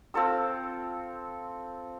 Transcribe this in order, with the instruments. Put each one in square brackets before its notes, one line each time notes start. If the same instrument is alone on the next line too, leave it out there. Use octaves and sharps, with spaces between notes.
[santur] C4 F4 A4 E6